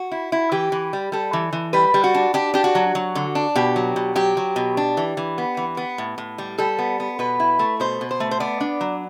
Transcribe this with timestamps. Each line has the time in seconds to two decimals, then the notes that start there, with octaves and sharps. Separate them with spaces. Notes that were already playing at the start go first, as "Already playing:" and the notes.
Already playing: F#4
0.11 E4
0.32 E4
0.52 E3 G4
0.72 E3
0.93 G3
1.12 G3 A4
1.33 E3
1.53 E3
1.73 G3 B4
1.94 G3
2.04 F#4
2.14 D4
2.34 D4 G4
2.54 D4 G4
2.64 F#4
2.75 F#3
2.95 F#3
3.15 D3
3.35 D4
3.56 B2 G4
3.76 F#3
3.96 B2
4.16 F#3 G4
4.37 F#3
4.56 B2
4.77 D4
4.97 E3
5.17 E3
5.38 B3
5.57 E3
5.77 B3
5.98 A2
6.18 A2
6.38 G3
6.58 G3 A4
6.79 B3
7.00 B3
7.19 B2 B4
7.40 E4
7.59 A3
7.80 B2 C5
8.01 B2
8.11 C5
8.20 A3
8.31 C5
8.40 B3 D5
8.61 D4
8.81 F#3